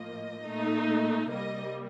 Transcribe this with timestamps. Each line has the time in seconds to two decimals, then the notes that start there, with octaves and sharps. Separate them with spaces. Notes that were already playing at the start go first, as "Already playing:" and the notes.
Already playing: A2 F3 A#3 D#5
0.43 A#2 A3 D#4
1.30 C3 G3 A#3 D#5